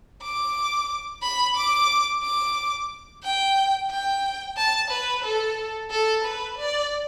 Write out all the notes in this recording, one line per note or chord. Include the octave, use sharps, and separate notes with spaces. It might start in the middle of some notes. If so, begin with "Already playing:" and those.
D6
B5
D6
D6
G5
G5
A5
B4
A4
A4
B4
D5